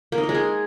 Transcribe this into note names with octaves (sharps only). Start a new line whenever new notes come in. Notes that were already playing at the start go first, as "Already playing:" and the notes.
A#3
D#4
A#4
G#3
G#4